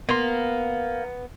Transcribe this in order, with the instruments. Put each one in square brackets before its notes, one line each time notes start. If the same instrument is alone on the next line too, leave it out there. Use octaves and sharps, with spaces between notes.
[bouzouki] A#3 [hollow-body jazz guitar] B3 C6